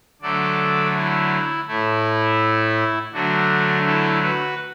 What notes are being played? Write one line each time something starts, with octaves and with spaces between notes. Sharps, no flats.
D3 F#3 A3 A4 D5
E4
A2 A3 E4
D3 F#3 A3 D4 F#4
E4 A4
F#4 B4